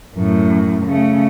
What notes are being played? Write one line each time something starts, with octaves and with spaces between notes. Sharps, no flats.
F#2 A2
C#3 A3